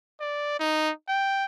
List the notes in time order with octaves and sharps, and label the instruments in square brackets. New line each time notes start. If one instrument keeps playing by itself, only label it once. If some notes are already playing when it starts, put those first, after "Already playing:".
[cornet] D5
D#4
G5